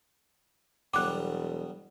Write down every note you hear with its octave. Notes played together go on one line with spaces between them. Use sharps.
E1 F#3 G3 B3 D6 F#6